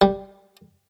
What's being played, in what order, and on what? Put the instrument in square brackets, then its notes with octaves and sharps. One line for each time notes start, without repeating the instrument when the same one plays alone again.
[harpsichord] G3